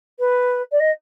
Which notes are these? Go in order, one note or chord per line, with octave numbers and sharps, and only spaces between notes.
B4
D5
D#5